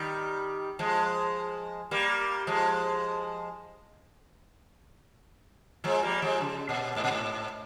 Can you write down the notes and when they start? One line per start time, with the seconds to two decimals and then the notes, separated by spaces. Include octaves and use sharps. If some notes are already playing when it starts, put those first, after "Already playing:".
Already playing: D#3 G3
0.79 F3 G#3
1.91 G3 A#3
2.47 F3 G#3
5.84 F3 G#3
6.03 G3 A#3
6.22 F3 G#3
6.41 C#3
6.69 A#2
6.96 G#2
7.04 A#2
7.11 G#2